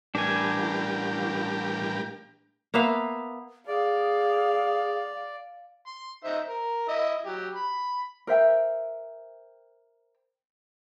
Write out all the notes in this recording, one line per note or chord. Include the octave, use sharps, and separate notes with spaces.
A2 E3 G3 D4 G4 A#4 G#5
A#3 B3 E5 F5
G#4 D5 F5
C6
D#4 C5 E5
A#4
E4 D#5 E5
F#3 G4
B5
A#4 C5 E5 G5